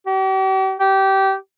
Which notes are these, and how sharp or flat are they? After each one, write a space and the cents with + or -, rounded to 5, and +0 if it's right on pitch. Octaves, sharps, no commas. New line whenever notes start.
G4 -45
G4 -20